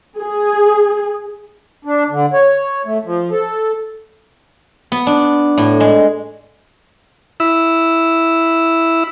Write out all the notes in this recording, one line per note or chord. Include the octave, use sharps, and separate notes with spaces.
G#4
D4
D3
C#5
A3
F3
A4
B3
D4
A2
G#3
E4 E6